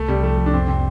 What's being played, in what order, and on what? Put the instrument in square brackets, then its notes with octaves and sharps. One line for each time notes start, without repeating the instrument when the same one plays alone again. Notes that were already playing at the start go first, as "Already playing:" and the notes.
Already playing: [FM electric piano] C2 [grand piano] A3
[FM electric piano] C3 [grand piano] G3
[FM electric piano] F3 [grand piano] A3
[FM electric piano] C2
[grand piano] D4
[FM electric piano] F2 [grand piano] C4
[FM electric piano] C3 [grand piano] C4